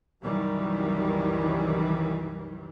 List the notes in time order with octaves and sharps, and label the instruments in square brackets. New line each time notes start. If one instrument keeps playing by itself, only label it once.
[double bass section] C2 F#2 D#3 E3 G3